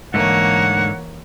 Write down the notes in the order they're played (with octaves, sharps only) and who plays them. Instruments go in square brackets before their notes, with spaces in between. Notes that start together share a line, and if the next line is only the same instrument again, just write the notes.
[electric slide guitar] G#2 D3 A3 [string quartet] E3 A#3 C#5 [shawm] F#5